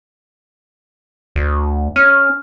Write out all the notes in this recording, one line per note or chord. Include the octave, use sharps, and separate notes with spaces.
D2
C#4 F6